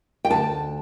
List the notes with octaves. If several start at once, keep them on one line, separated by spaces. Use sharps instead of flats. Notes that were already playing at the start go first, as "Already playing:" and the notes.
G5
D2 A5